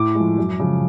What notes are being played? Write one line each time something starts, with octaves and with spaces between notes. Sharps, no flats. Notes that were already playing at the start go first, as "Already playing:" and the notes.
Already playing: A2 D6
G#3
F3
F#2
C#3 F3 G#3